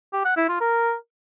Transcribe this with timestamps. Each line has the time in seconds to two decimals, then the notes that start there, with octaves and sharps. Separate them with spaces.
0.13 G4
0.25 F#5
0.37 E4
0.49 F4
0.61 A#4